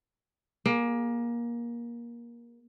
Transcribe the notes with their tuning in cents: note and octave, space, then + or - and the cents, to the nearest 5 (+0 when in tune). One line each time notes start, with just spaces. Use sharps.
A#3 +20 G#4 +0